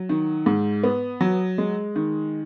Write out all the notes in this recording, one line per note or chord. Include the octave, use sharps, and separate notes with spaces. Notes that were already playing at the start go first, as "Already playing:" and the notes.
Already playing: F#3
D#3
G#2
B3
F#3
G#3
D#3